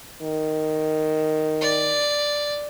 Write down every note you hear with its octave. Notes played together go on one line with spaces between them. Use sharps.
D#3
D5